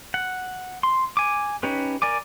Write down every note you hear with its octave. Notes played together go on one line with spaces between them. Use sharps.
F#5
C6
G#5 D6
C#4 D#4 G4 B4
A#4 D5 G#5 D6